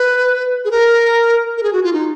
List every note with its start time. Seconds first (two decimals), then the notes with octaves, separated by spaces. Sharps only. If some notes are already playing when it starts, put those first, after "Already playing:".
Already playing: B4
0.65 G#4
0.71 A#4
1.57 A#4
1.63 G#4
1.73 F#4
1.83 F4
1.93 D#4